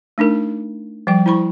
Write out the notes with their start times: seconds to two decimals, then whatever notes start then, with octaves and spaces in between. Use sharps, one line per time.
0.18 A3 D4 D#4 A#4
1.07 F3 G3 G5
1.26 E4 C5 B5 C#6